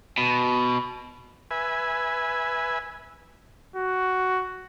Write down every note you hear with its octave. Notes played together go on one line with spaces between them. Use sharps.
B2
B4 E5 G#5
F#4